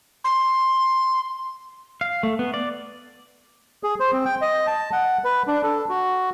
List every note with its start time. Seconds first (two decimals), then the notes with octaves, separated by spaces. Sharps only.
0.24 C6
2.01 F5
2.23 A3
2.39 B3
2.54 D5
3.83 G#4
4.00 C5
4.13 C4
4.25 G5
4.41 D#5
4.67 A5
4.92 F#5
5.24 B4
5.47 D4
5.63 A4
5.89 F#4